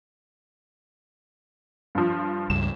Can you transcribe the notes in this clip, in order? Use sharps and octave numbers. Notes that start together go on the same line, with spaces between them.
G2 F3
C#2 G2 E7